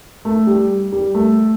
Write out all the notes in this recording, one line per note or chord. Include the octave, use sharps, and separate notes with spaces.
A3
G3
G3
A3